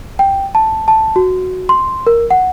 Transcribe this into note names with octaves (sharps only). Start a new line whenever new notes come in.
G5
A5
A5
F#4
C6
A#4
F#5